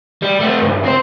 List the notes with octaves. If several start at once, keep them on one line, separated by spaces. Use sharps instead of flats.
G3
A3 C4
C#2 G2
C4 C5